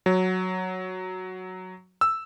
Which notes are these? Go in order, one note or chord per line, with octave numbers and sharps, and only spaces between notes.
F#3
E6